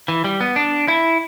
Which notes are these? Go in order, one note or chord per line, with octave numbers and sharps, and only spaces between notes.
E3
G3
B3
D4
E4